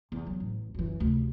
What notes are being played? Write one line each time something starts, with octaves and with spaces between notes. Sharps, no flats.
E2
F#3
A1
F#2 E3
D2 C3